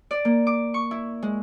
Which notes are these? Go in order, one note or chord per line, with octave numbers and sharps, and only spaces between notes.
D5
A#3
D6
C#6
E4
G#3